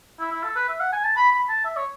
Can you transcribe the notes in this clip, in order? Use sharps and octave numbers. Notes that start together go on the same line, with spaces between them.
E4
E4
A4
B4
E5
F#5
G#5
A5
B5
B5
A5
E5
C#5